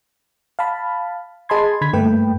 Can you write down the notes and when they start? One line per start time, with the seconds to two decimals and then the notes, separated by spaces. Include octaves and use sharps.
0.59 F5 A5 B5
1.49 G#4 D#5 A5 B5 C6 G#6
1.81 D3 B5 G#6 B6
1.93 G2 A3 A#3 B4 G5